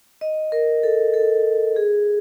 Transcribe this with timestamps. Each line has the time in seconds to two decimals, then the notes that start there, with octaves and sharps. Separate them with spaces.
0.21 D#5
0.52 A#4
0.83 A4
1.14 A4
1.76 G#4